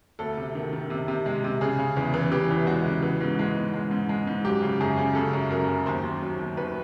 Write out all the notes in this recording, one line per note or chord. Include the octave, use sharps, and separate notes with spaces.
D2 A4
C3
D#3
D#3
C3
C3
G#3
C3
C#3 G#4
C#3
E2
E3
E3 G4
E2
G#3 F#4
C#3
E3
G#2
G#3
G#2
G#3
G#2
G#3
G#2
F#3 G4
C#3
F#2 G#4
C#3
C#3 A4
F#2
F#2 A#4
F#2
D#2 C5
D#2
F#3
D#2
D#2 B4